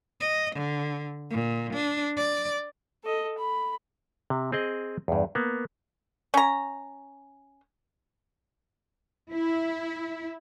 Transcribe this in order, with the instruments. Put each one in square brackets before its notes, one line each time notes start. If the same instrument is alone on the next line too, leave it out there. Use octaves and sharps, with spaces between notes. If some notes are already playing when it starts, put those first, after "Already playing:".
[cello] D#5
D3
A#2
D4
D5
[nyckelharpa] A4 D#5
B5
[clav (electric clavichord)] C3
C4 G#4 D#5
E2 G2
A#3 B3
[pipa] C#4 A#5
[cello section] E4